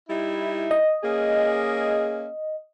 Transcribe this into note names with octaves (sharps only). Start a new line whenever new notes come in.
G3 D#4 E4
D#5
A#3 C#4 G#4